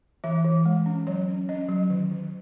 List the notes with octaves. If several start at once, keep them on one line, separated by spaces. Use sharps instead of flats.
E3 E5
E3
G#3
C#4
F#3 C#5
C#4
C#4 D#5
F#3
D#3
D#3